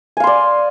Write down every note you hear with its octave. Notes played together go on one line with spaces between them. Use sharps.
D5 F5 G#5 C6